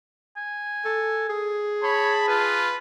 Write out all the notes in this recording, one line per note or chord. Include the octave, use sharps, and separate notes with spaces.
G#5
A4
G#4
C#5 A5 B5
F4 B4